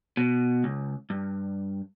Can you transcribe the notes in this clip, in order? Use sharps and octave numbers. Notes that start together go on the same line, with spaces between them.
B2
C#2
G2